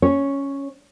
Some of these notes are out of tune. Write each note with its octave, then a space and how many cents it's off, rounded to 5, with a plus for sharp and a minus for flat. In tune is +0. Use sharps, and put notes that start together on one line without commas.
C#4 +0 C#5 +0